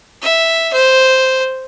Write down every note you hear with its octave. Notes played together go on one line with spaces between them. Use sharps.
E5
C5